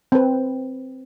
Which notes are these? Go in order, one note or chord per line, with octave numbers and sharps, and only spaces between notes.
C4 B4